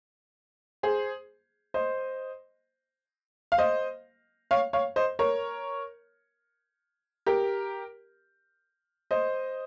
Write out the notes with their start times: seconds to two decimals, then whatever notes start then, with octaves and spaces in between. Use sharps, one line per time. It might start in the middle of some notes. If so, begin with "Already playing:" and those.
0.83 G#4 C5
1.74 C5 D#5
3.52 F5
3.58 C5 D#5
4.51 C#5 F5
4.73 C#5 F5
4.96 C5 D#5
5.19 A#4 C#5
7.26 G4 A#4
9.11 C5 D#5